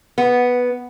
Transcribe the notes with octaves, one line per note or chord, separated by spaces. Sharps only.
B3